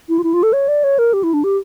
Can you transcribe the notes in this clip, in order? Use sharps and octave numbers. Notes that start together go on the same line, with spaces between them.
E4
F4
E4
F4
A4
C#5
D5
C#5
A#4
G4
E4
D4
G4